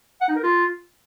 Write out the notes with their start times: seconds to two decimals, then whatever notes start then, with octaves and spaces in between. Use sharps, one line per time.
0.21 F#5
0.28 D#4
0.36 A#4
0.43 F4